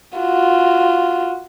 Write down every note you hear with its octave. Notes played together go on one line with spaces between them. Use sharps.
F4 F#4